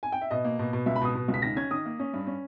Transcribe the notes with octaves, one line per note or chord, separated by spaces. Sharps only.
G#5
G5
E5
B2 D#5
A#3
B2
B2
C#2 E5
B5
B2 D#6
B2
C#2
B6
D#3 A#6
C#4 G#6
D#3 D#6
A#3
C#4
G2
C#4